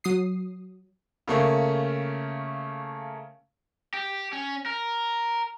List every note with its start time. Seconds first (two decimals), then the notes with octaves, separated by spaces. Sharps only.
0.04 F#3 D#6 C7
1.28 C#3 A3 A#3 C#4
3.94 G4
4.33 C#4
4.66 A#4